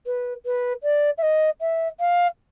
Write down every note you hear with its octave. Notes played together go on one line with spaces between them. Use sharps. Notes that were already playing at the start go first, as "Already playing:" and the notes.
B4
B4
D5
E5
D#5
E5
F5